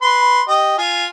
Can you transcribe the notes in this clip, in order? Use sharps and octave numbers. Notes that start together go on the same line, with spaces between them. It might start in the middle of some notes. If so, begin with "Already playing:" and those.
B4 C6
G4 D#5
F4 F5 G#5